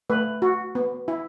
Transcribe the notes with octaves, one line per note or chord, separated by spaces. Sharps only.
A3 B4
F#4
B3
E4